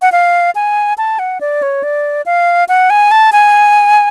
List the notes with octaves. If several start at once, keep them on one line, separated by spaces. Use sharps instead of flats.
F#5
F5
G#5
A5
F#5
D5
C#5
D5
F5
F#5
G#5
A5
G#5